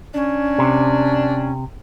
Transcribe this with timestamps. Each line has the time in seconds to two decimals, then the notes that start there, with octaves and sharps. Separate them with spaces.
0.14 C#4 D4
0.58 C3